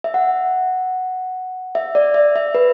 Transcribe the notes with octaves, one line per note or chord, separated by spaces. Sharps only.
E5
F#5
E5
D5
E5
E5
B4